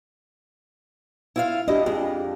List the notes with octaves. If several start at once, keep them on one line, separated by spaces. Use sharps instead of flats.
E4 F4 F5
D4 E4 G4 D#5
F2 G#4